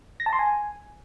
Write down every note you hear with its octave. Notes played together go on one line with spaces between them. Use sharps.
A#6
A5
C6
G#5